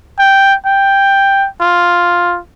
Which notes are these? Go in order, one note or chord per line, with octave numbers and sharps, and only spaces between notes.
G5
G5
F4